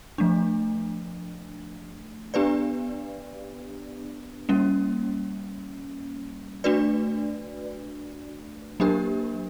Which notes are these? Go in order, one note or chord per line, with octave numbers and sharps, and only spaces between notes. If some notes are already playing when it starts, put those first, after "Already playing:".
F3 A3 D4
B3 D4 G4 B4 D5
G3 A#3 C#4
A3 D4 F#4 B4 D5
F#3 A#3 D4 G4 A#4